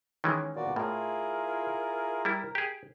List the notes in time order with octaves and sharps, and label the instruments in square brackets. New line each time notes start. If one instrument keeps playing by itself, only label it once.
[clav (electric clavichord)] D#3 E3 G#3 [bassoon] C#4
[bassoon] A#2 [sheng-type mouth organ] B3 F#4 D5
[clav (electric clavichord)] A2 [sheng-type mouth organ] E4 F4 G#4 [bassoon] A#4
[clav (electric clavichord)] G3 E4
G4 G#4